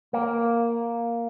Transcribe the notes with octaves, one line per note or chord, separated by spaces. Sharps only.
A#3